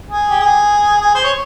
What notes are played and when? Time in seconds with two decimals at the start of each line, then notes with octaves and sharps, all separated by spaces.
0.09 G#4
0.30 G4
0.40 G#4
1.00 G#4
1.15 C5
1.24 C#5